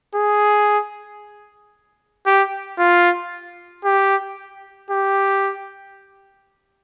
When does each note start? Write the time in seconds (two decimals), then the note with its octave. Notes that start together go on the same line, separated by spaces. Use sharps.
0.15 G#4
2.26 G4
2.79 F4
3.84 G4
4.90 G4